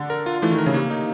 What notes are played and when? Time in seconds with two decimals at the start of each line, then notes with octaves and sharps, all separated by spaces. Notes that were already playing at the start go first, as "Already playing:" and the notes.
Already playing: D3
0.10 A#4
0.26 F4
0.42 E3 A3
0.50 D#3
0.58 A#4
0.66 C#3
0.74 C3 A#3
0.90 D#4